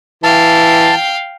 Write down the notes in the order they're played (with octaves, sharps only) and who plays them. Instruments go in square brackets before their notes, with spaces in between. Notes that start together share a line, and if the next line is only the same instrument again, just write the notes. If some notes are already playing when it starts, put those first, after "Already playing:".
[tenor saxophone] E3 [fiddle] F5 G5 [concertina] A5